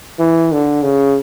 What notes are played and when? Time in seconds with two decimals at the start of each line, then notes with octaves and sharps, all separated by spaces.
0.19 E3
0.52 D3
0.83 C#3